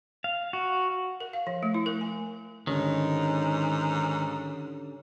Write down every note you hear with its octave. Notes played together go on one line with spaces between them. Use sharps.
F5
F#4
A#4
F5
F3
A3
E4
A#4
G#5
G#2 D3 D#3 G3 C#4